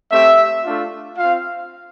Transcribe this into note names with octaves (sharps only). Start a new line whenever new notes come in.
A3 C4 G4 E5
A3 D4 F4
C4 F4 F5